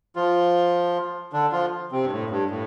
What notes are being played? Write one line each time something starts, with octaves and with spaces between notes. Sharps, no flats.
F3 F4
D3 D4
F3 F4
C3 C4
G2
A2
G2
A2